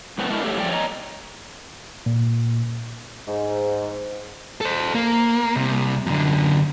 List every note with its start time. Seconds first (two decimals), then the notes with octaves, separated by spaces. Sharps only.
0.18 F#2 A2 B3 C4
0.30 G#3 A3 D4 E4 A#4
0.43 A3 G4 A4 C#5 E5
0.57 F3 G3 C#4 D5 G5
0.71 C#5 D#5 A#5
2.06 A#2
3.28 G#2
4.61 A4 C5
4.94 A#3
5.56 C2 C3
6.06 F#2 D3